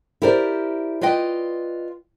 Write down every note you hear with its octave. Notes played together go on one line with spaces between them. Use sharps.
E4 G4 A#4 C5 D5
F4 B4 D5 D#5 G5